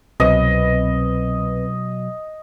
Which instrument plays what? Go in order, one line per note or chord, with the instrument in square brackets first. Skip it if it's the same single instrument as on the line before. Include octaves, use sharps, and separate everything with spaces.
[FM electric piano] C2 C4 B4 [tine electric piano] B2 F#3 [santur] D#5